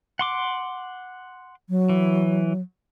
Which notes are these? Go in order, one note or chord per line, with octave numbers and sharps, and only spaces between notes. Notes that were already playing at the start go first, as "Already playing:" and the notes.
F#5 C6 D6
F#3
E3